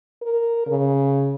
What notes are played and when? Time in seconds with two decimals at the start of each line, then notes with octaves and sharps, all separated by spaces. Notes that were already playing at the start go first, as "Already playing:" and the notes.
0.22 A#4
0.67 C#3